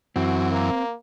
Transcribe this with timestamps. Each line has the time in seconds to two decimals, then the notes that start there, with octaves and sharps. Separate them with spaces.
0.16 F#2 E3 C4 F#4
0.52 A#3